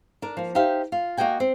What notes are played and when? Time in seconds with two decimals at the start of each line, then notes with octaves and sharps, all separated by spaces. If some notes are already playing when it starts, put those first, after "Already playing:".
0.22 D4 A#4
0.37 F3 A#3
0.55 D#4 G4 C5 E5 F5
0.92 F4
1.17 A#3 F#4 D#5 G5 G#5
1.40 C4